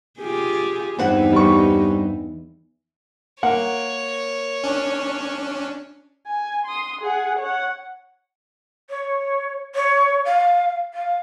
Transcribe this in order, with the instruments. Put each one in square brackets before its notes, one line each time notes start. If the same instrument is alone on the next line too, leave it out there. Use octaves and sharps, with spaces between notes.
[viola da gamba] F4 G4 G#4
[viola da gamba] E2 E3 D#4 [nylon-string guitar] G2 C4 F#5
[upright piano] G3 C#6
[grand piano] A#3 [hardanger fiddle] C#5 [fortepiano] F#5
[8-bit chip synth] C#4 D4
[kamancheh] G#5
C6 D#6
G#4 F#5
C#5 F#5
[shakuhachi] C#5
C#5
F5
F5